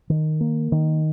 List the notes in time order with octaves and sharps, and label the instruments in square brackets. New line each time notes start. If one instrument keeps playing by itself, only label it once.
[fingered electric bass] D#3
A#3
D#3